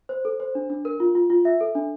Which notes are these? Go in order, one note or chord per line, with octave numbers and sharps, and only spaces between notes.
C5
A4
C5
D4
D4
A#4
F4
F4
F4
E5
A4
D4